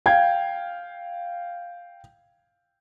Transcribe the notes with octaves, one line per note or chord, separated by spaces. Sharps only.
F5 G5 G#6